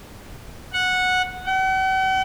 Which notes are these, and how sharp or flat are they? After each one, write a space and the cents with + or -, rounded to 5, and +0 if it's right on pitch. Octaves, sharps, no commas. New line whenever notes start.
F#5 -10
F#5 +45